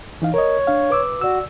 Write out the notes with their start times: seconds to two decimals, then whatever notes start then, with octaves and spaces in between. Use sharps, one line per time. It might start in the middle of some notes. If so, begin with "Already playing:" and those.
0.22 E3 D#4 F5
0.34 A#4 C#5 D#5
0.67 D4 F5
0.90 B4 D6 E6
1.21 F#4 D5 E6